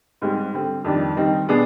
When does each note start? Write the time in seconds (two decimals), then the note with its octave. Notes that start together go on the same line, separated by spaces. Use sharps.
0.22 G#2 G3 C4
0.53 D3 G3 C4
0.84 F2 D#3 G3 D4
1.16 D#3 G3 C4 D#4
1.48 B2 B3 D4 G#4